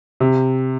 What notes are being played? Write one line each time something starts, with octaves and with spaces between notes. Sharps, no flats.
C3